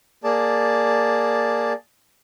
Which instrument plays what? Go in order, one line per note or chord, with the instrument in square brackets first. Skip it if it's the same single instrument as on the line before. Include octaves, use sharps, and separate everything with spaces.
[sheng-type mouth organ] A#3 G#4 D5 A5